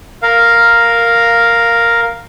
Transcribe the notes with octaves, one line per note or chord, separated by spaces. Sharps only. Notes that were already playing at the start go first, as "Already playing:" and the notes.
A#4 F5